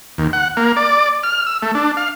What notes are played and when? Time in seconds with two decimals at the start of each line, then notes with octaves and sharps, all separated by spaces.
0.18 D#2
0.33 F#5
0.57 A#3
0.76 D5
1.23 F6
1.47 E6
1.63 A3
1.75 D4
1.97 F5